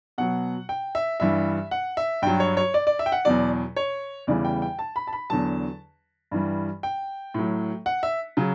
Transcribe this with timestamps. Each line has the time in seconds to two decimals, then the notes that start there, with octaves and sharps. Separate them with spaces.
0.18 B2 F#3 F#5
0.69 G5
0.95 E5
1.20 G2 E3 G3 E5
1.71 F#5
1.97 E5
2.22 G2 F#3 G5
2.40 C#5
2.57 C#5
2.74 D5
2.87 D5
2.99 E5
3.06 G5
3.12 F#5
3.25 E2 B2 F#3 D5
3.76 C#5
4.27 E2 C#3 E3 G3 D5
4.45 G5
4.62 G5
4.79 A5
4.96 B5
5.07 A5
5.13 B5
5.30 E2 D3 F#3 A5
6.31 G2 E3 G3
6.83 G5
7.34 A2 F#3
7.86 F#5
8.03 E5
8.37 C#3 F#3